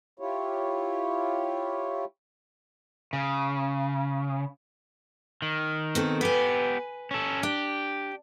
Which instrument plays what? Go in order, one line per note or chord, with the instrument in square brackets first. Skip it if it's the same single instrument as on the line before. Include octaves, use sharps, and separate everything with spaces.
[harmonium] E4 F4 G4 C#5
[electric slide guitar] C#3
[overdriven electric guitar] D#3
[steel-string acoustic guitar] B2 C4 A4
[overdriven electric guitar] B3 G4 [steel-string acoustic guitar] B4 G#5
[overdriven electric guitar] C#4 A4
[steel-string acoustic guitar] D4 [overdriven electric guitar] G4